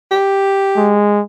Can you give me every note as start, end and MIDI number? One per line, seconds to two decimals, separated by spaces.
0.11 1.00 67
0.76 1.21 56